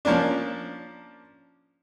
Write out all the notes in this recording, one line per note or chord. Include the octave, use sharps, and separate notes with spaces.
F3 A#3 C#4 D4